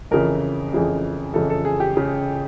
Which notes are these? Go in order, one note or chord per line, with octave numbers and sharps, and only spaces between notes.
F2 C#3 E3 A#4
F2 C#3 E3 G#4
F2 C#3 E3 A4
A4
G#4
G4
C#3